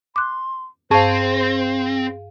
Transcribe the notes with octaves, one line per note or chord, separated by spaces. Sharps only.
C6 D6 F#6
G2 C4 G#4 C5 F5 A5 C#6